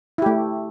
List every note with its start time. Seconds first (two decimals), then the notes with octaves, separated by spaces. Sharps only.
0.18 E4
0.22 G4
0.26 A3